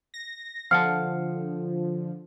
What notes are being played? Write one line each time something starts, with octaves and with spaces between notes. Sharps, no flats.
A#6
D3 F3 F5 F#5 A5 F6